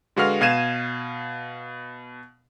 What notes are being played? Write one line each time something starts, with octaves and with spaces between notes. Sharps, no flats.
D3 G#3 F#4 B4 F5 F6
B2 F5 G#6 D#7 E7